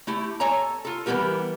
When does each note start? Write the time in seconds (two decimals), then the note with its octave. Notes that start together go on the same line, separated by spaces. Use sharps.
0.07 A3 E4 G4
0.40 A4 C#5 G#5 A#5
0.85 F4 A4
1.06 E3 G3 A#3 B3 G4 A#4